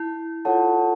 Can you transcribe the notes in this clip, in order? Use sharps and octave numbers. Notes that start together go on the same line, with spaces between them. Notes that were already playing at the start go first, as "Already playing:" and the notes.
Already playing: E4
F4 A4 C#5 F#5 A5